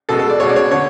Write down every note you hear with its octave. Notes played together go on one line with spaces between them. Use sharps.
B2 G#3 A4
A4
D5
B2 G#3 C#5
D5
C#5
D3 C#5